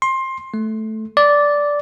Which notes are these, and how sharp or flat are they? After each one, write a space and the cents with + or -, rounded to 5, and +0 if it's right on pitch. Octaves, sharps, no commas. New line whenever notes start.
C6 +20
A3 -10
D5 -10